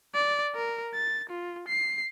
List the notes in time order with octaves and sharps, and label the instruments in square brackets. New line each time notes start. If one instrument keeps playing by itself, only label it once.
[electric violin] D5
A#4
A6
F4
C7